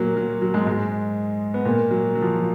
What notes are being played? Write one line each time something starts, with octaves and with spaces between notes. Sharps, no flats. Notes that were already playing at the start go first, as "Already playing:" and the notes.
Already playing: A#2 F#3 A#3
F#3
F#3
G#2 G#3
G#2 G#3
B3
A#2 A#3
F#3
F#3
F3
F3